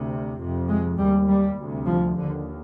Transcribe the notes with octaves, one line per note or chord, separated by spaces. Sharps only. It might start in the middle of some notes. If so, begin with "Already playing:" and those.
Already playing: D2 C3
F2 C3
G#3
D#2 G3
G3
D2 C3
F3
D#2 D3